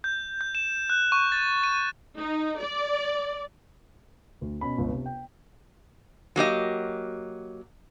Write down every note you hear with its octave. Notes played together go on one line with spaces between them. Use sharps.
G6
G6
E7
F#6
C#6
A6
D#7
D#4
D5
D2
B2 C#4 B5
G1 C#2
C3
G5
F#3 A#3 G4 D#5